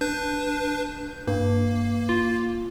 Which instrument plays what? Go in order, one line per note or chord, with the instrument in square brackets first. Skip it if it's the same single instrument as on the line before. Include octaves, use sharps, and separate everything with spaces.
[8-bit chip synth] D4 B4 [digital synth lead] G6
[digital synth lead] G2 [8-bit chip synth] A#3
[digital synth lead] F4